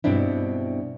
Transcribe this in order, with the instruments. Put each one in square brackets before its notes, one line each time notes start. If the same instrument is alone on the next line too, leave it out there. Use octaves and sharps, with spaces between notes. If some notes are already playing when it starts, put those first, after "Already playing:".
[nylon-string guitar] G2 B2 C4 D4 E4